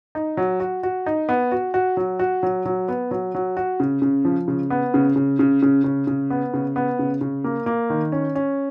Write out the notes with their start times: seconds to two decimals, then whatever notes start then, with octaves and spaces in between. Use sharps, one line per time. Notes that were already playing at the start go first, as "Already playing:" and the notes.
0.15 D#4
0.37 F#3
0.60 F#4
0.83 F#4
1.06 D#4
1.29 B3
1.52 F#4
1.74 F#4
1.97 F#3
2.19 F#4
2.43 F#3
2.66 F#3
2.88 B3
3.11 F#3
3.35 F#3
3.57 F#4
3.80 C#3
4.02 C#3
4.25 F3
4.48 C#3
4.70 B3
4.94 C#3
5.16 C#3
5.39 C#3
5.62 C#3
5.84 C#3
6.07 C#3
6.30 B3
6.54 C#3
6.76 B3
6.99 C#3
7.21 C#3
7.44 A#3
7.66 A#3
7.90 D#3
8.12 C#4
8.35 C#4